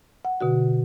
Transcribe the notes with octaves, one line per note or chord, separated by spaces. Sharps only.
F#5
B2 D3 F#4